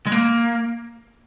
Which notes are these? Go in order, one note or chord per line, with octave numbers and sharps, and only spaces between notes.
G#3
A#3